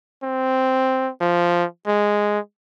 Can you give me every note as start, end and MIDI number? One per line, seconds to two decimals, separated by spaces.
0.23 1.10 60
1.21 1.65 53
1.87 2.39 56